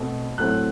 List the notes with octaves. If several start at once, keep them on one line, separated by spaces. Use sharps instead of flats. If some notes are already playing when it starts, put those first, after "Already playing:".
Already playing: B2 A3 C4
A2 F#3 A3 C4 F#6